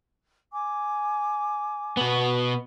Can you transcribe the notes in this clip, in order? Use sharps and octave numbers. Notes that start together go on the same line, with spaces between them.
G#5 D6
B2 B3